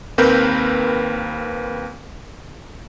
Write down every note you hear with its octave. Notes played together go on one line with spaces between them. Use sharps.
D#2 A#3 C4 A#4 B4 G6